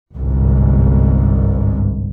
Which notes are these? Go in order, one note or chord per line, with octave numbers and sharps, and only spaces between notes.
G1 C2 G#2